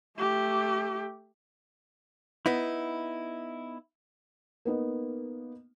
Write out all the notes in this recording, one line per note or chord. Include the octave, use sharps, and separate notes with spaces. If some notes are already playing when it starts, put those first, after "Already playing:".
A3 G4
B3 D#4 E4
A#3 B3 D#4